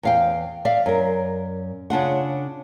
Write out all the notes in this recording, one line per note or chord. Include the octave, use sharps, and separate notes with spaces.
E2 F5 G5
D5 E5 F5
F#2 A#4
C#3 D4 F4 F#5